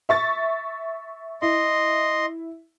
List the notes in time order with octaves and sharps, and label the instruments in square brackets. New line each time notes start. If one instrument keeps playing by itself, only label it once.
[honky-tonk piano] E5 C#6 A6
[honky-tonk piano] E4 [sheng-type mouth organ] D#5 C6